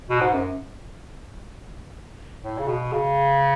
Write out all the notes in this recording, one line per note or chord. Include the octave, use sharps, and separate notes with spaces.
B2
G#2
F#2
A2
C#3
B2
C#3